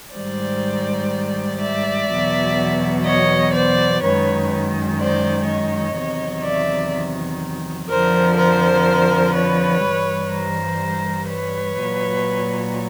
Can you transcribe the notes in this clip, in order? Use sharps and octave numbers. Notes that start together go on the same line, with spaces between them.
G#2 D#3 G3 C5 D5
D5 E5
E2 B2 F#3
C#5 D#5
C5 D5
F#2 D#3 G#3 B4 C#5
C5 D5
C#5 D#5
E2 C3 D#3 F#3
D5 E5
F2 D3 F3 A#4 C5
A#4 C5
B4 C#5
G2 E3 G3
A#4 C5
B4 C#5
A#2 F#3